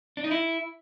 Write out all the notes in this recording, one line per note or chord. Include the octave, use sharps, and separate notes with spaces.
D4
D#4
E4